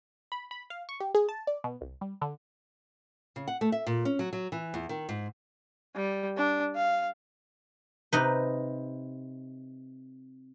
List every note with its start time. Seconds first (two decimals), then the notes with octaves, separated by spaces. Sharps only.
0.32 B5
0.51 B5
0.70 F5
0.89 C#6
1.00 G4
1.15 G#4
1.29 A5
1.47 D5
1.64 B2
1.81 C2
2.01 G3
2.21 D3
3.36 C#3
3.48 F#5
3.61 A3
3.72 E5
3.87 A#2
4.05 C#4
4.19 F#3
4.33 F#3
4.52 E3
4.74 E2
4.89 D#3
5.09 G#2
5.96 G3
6.37 D4
6.76 F5
8.13 C3 D#4 B4